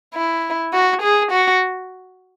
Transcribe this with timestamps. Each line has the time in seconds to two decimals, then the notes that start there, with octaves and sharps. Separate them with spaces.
0.14 E4
0.73 F#4
1.02 G#4
1.31 F#4